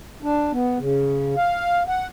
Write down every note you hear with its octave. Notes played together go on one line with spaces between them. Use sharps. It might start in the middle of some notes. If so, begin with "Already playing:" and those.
D4
B3
C#3
F5
F#5